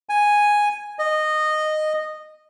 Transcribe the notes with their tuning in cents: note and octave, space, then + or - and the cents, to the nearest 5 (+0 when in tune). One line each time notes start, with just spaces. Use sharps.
G#5 -5
D#5 -15